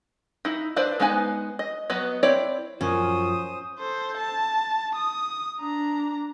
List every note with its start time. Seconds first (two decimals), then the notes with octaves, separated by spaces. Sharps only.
0.45 D#4 E4
0.76 D4 E4 B4 C5 D5
1.00 G#3 B3 D#4 B4 G#5
1.59 D#5
1.90 F#3 B3 B4 D#5
2.23 C4 E4 C#5 D5
2.81 F#2 F3 C#4 C5 D#6
3.79 A4 C5
4.18 A5
4.96 D#6
5.61 D4 A#5